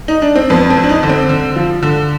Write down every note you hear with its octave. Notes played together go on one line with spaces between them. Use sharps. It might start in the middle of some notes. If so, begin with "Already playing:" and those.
D#4
D4
C4
F2 B3
C4
F2
D4
D#4
D3
C4
D3
F3
D3